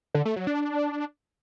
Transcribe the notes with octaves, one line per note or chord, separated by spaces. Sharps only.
D3
A3
F#3
D4